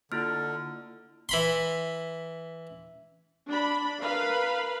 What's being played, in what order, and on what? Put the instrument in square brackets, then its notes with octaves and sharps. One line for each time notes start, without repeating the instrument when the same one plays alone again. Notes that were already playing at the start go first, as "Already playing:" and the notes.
[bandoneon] D3 [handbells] A#3 E4 F4 [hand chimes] F6
[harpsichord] E3 B5 C6
[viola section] D4 B5
A#4 B4 F5 B5